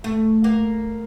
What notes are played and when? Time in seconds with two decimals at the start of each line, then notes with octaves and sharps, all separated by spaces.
0.04 A3
0.44 A#3